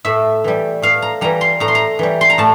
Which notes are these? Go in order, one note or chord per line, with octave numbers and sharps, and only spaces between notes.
A2 E5
E3 G3
A2 F5
A#5
E3 G3 A#5
C6
A2 A#5
C6
A#5
E3 G3
C6
A#5
A2 A5